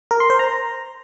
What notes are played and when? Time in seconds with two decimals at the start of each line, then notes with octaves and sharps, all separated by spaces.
0.11 A#4
0.20 C6
0.30 C5
0.39 A#5